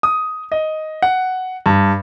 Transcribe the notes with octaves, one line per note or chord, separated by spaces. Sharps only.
D#6
D#5
F#5
G2